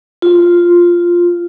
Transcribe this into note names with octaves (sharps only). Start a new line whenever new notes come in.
F4